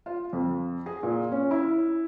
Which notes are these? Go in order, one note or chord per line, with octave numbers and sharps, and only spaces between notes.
F4
F2
G#4
A#2
C#4
E4